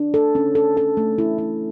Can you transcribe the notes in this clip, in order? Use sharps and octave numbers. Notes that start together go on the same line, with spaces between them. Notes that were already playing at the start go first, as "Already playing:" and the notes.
Already playing: D4
A4
C#4
A4
A4
A3
E4
E4